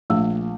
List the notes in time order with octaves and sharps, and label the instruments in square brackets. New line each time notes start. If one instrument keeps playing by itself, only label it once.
[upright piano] A#1 [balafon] A3